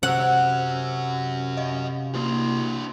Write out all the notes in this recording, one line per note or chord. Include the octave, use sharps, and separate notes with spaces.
C3 C#4 F#4 C5 F#5 E6
D#5 F5
A#3 D4 E4 F#4 C5